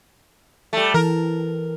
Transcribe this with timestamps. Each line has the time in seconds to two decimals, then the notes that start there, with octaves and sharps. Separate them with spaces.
0.73 G3 A3
0.94 E3 A#4